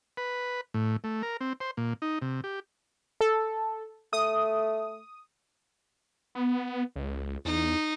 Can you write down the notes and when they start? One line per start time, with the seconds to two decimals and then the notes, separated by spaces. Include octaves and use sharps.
0.17 B4
0.74 A2
1.04 A3
1.23 A#4
1.41 C4
1.60 C5
1.77 A#2
2.02 D#4
2.22 C3
2.44 G4
3.21 A4
4.13 A3 D#6
6.35 B3
6.96 C#2
7.45 E2 D#4